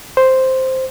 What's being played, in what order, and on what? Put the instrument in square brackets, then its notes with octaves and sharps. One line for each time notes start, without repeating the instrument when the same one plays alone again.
[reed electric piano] C5